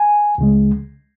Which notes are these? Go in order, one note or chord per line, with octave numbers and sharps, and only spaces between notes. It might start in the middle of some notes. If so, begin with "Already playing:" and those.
Already playing: G#5
C#2 C#3 G#3